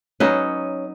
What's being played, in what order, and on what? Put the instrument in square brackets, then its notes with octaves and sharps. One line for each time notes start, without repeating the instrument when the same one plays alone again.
[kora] F#3 D#4 B4 [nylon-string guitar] C#4